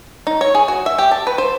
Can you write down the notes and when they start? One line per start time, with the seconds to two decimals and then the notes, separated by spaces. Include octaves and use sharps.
0.27 D#4
0.41 C#5
0.55 G#4
0.68 F#4
0.86 E5
0.98 G4
1.11 A5
1.27 B4
1.38 C5